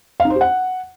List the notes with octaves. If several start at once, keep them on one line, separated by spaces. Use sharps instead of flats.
F5
D#4
C5
G4
F#5